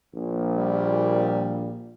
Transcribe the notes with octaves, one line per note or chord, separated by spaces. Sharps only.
A#1 A#2
G3